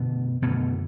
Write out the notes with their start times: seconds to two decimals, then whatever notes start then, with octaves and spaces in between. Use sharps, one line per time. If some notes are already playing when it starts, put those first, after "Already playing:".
Already playing: F#2 B2 D3 B3
0.42 F#2 B2 D3 B3